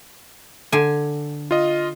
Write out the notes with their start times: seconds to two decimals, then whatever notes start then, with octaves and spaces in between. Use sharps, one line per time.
0.72 D3 G#5
1.51 F4 D#5